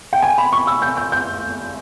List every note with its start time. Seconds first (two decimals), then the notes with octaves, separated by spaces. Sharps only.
0.13 G5
0.22 G#5
0.38 B5
0.53 C#6
0.67 E6
0.82 G6
0.97 G6
1.12 G6